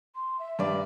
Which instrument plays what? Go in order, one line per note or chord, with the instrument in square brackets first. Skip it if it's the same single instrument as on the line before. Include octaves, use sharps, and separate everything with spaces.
[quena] C6
E5
[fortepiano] G2 [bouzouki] D#3 D5